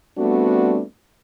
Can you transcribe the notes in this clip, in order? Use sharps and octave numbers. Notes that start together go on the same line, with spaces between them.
G3 A3 B3 C4 D4 F#4